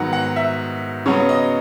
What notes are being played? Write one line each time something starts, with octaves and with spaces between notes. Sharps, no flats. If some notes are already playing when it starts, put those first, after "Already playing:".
Already playing: G#2 D#3 F#3 B3 F#5
F#5
E5
C#3 F#3 B3 C#5
D#5